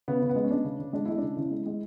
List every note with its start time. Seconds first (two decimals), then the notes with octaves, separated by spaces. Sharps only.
0.08 C#3 B3
0.22 C#3
0.29 B3
0.36 G#3
0.44 C#4
0.51 G#3 D4
0.64 C#3
0.79 C#3
0.93 G#3 D4
1.05 G#3 E4
1.18 C#3 D4
1.37 C#3 E4
1.51 G#3
1.66 G#3